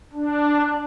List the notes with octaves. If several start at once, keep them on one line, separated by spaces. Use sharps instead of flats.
D4